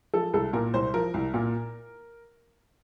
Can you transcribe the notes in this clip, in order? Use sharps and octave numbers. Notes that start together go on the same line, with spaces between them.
F3 A4
C2 A4
A#2 A#4
C2 C5
F3 A#4
C2
A#2